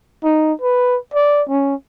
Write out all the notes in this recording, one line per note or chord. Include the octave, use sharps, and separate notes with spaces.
D#4
B4
D5
C#4